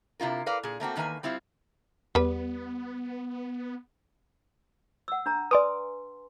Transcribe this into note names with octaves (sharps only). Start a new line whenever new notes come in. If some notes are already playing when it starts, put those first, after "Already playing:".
C3 E4 F4 A#4
A#4 B4 D5 F5
A#2 G#4
A3 A#3 C4 F#4
E2 D#3 A#3 B4 G#5
G3 C4 E4 F4
E2 G3 B3 B4
F#5 E6
D4 A#5
B4 D5 G#5 C6 D6 D#6